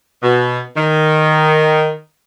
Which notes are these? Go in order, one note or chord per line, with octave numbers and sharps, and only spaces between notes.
B2
D#3